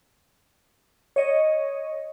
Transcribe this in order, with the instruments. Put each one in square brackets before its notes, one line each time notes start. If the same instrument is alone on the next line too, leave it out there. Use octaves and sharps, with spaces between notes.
[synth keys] C#5 D#5